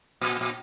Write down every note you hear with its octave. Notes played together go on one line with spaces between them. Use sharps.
A#2
A#2